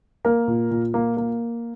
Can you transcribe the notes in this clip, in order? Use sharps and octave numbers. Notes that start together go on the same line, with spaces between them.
A#3 A#4
A#2
A#2
A#3
A#3